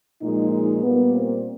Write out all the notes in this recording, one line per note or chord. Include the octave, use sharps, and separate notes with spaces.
A#2 F3 G#3 D#4
D#4
A#2 G3 A#3 B3
C4